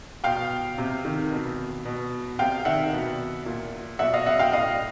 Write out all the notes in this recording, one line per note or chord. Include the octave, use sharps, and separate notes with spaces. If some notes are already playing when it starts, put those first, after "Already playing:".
B2 F5 G5
C3
D#3
B2
B2
C3 F5 G5
D#3 E5 F#5
B2
A#2
B2 E5 F#5
D#5 F5
E5 F#5
F5 G5
A2 D#5 F5